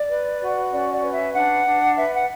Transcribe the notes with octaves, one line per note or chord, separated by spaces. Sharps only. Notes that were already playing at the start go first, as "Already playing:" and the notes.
Already playing: D5
B4
F#4
C#4 D5
D5
B4
E5
D4 F#5
D4
B4 E5
F#5